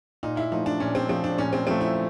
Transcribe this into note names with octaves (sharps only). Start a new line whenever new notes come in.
A#2 D#4
E4
F3 A3 D#4
D4
A#2 C#4
C4
F3 A3 C4
D4
A#2 C#4
C4
F3 A3 C4
E4